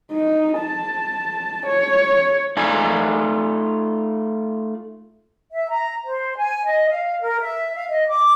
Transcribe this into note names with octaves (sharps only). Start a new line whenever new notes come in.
D#4
A5
C#5
A3 D#4 F4 D5 G#5
E5
A#5
C5
G#5
D#5
F5
A#4
E5
F5
D#5
D6